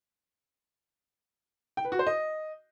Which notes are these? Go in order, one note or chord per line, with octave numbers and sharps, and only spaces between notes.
G5
B4
F#4
C5
D#5